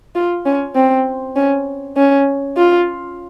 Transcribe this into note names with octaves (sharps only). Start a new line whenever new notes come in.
F4
C#4
C4
C#4
C#4
F4